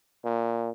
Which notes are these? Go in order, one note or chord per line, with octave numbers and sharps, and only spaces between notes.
A#2